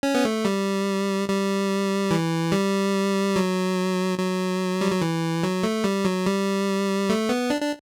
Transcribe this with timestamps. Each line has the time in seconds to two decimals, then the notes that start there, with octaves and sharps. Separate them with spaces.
0.03 C#4
0.15 B3
0.25 A3
0.45 G3
1.29 G3
2.11 E3
2.52 G3
3.36 F#3
4.18 F#3
4.81 G3
4.91 F#3
5.01 E3
5.43 F#3
5.63 A3
5.84 G3
6.05 F#3
6.26 G3
7.09 A3
7.29 B3
7.50 D4
7.61 D4